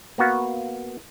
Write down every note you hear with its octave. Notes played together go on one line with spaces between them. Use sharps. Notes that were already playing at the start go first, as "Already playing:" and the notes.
A#3 B3 F#4 F5